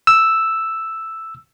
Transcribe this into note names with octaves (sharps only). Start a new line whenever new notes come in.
E6